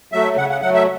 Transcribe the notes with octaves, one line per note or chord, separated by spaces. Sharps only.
F#3 A3 E5
C#3 F#5
F#5
F#3 A3 F#5
E5